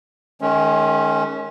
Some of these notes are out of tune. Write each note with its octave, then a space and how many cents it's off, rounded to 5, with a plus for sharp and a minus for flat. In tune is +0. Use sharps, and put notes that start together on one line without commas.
D#3 +0 G#3 +40 C#4 +0